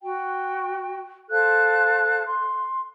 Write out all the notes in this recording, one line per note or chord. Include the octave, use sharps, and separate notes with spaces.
F#4 G5
A4 C5 F5 F#6
C6